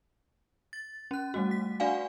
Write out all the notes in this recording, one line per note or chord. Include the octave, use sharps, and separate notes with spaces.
A6
C#4 F#6
G3 A3 F#4
B6
D4 F#4 D5 F5 F#5 G#5